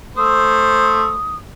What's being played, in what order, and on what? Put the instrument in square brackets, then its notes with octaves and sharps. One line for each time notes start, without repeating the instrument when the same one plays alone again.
[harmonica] A3 C5 [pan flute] D#6